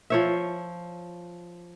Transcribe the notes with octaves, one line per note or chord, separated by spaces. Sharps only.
F3 C#5 E5